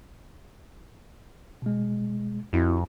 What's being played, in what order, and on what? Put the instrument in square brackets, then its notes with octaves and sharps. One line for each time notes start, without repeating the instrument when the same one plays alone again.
[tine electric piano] B2 G#3
[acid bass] F2 [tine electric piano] C4 E4 F#4